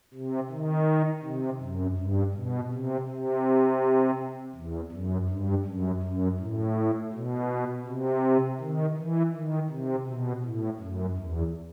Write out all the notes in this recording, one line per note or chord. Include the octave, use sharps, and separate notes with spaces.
C3
D#3
C3
F#2
G2
B2
C3
C3
E2
F#2
G2
F#2
F#2
A2
B2
C3
D#3
E3
D#3
C3
B2
A2
F#2
E2